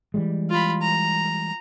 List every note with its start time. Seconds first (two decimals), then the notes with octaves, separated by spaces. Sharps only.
0.14 E3 G3 G#3
0.50 F4 B5
0.82 A#5